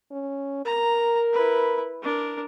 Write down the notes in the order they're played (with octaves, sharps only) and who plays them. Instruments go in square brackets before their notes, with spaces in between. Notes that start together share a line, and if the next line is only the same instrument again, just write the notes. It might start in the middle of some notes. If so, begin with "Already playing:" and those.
[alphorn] C#4
[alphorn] A#4 [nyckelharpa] A#5
[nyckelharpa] E4 B4
D4 A#4